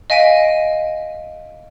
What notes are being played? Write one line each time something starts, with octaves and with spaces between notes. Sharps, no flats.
D#5 F5 G#5 B6 D7 D#7